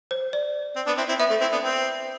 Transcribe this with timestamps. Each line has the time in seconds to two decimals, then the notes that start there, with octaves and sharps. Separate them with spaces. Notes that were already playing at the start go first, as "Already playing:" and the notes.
0.11 C5
0.33 D5
0.76 C4
0.87 B3 D4
0.97 C4 E4
1.08 C4 E4
1.19 B3 E5
1.30 A3
1.41 C4 E4
1.52 B3 D4
1.62 C4